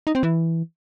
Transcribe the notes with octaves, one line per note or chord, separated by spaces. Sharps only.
D#4
C4
E3